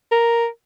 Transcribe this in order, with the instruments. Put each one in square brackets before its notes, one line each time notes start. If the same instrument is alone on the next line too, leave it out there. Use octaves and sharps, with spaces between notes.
[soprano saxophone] A#4